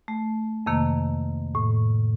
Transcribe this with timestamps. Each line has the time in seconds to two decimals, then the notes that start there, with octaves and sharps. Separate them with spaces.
0.08 A3
0.66 F2 C3 D#3 A#3
1.55 A2